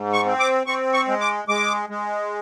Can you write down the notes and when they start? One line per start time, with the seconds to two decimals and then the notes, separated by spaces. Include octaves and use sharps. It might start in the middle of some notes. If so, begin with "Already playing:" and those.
Already playing: G#2
0.13 C#6
0.26 C4
0.40 D6
0.67 C4 C#6
0.94 C#6
1.08 G#3
1.21 D6
1.48 G#3 D6
1.89 G#3